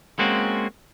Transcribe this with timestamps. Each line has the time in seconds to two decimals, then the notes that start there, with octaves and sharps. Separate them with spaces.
0.19 G#3 A#3 C4 C#4 F#4